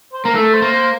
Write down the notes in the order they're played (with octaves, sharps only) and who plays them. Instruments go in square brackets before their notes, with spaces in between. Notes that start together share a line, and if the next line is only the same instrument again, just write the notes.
[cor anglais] C5
[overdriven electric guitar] A#3 [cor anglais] A#4
[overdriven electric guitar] A3 [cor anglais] A4
[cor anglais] C5
[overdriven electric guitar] A#3
[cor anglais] C5